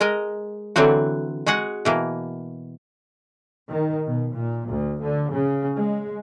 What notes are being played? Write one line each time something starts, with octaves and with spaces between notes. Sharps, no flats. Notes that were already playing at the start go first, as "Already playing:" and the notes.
G#3 A#4 D#5
D3 E3 F#3 C4 F#4
G#3 F#4 G#4 F#5
B2 E3 A#3
D#3
B2
A#2
D2
D3
C#3
G#3